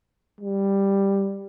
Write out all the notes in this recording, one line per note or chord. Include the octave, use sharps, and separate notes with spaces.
G3